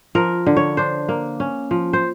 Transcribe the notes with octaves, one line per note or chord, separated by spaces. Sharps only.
F3 A#4
D3
C#5
D4 C5
A#3
C#4
F3
C5